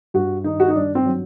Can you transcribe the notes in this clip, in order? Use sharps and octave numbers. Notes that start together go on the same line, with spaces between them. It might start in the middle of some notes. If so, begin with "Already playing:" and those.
G2 F#4
D#3 D#4
F#4
D#4
G2 D4
C4
F#3